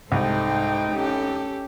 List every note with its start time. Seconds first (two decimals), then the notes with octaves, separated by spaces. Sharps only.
0.12 C2 G#2 D#4 A4 C5 G5
0.93 C#4 G4 A4